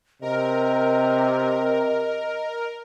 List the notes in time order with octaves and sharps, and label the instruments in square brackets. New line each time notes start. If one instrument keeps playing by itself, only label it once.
[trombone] C3 [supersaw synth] A#4 [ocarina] D#5